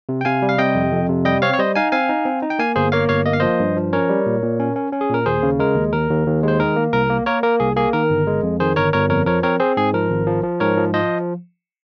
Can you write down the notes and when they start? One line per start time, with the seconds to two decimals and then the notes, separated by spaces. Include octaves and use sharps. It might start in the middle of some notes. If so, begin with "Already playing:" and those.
0.09 C3
0.21 G5
0.25 C3 F5 G#5
0.42 G3
0.49 F5
0.58 C3 D#5 G5
0.75 F2
0.92 F2
1.09 C3
1.25 G3 D#5 G5
1.42 C4 C#5 F5
1.53 C#5
1.59 G3 C5 D#5
1.75 D#4 F5 G#5
1.92 C4 F5 G#5
2.09 D#4
2.25 C4
2.42 D#4
2.50 G5
2.59 A#3 F5 G#5
2.76 G1 G#4 C5
2.92 A#3 C#5 F5
3.09 G1 C#5 F5
3.26 A#3 D#5
3.33 F5
3.40 F3 C5 D#5
3.60 G2
3.76 F3
3.93 C#4 A#4 C#5
4.09 G3
4.26 A#2
4.42 A#2
4.60 C#4
4.76 C#4
4.92 C#4
5.01 G#4
5.09 A#2 A#4
5.26 D#2 G#4 C5
5.43 C#3
5.59 G#3 A#4
5.76 D#2
5.93 D#2 A#4
6.10 D#2
6.27 D#2
6.43 G#3 C5
6.60 D#3 A#4
6.76 A#3
6.93 C2 A#4
7.10 A#3
7.26 A#3 A#4 C#5
7.43 A#3 A#4
7.60 C2 G#4
7.76 A#3 G#4
7.93 D#3 A#4
8.10 G1
8.27 G#3
8.43 F2
8.60 D#3 G#4 C5
8.76 G1 A#4 C#5
8.93 G1 A#4 C#5
9.10 F2 A#4 C#5
9.26 F3 A#4 C#5
9.43 C4 A#4 C#5
9.60 C4 G#4 C5
9.77 G#2 G#4
9.94 F3 A#4
10.10 G#1
10.27 F3
10.44 F3
10.60 G#2 A#4 C#5
10.77 F3
10.94 F3 C5 D#5